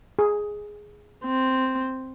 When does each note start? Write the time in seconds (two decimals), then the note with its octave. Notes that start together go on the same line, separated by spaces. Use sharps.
0.19 G#4
1.25 C4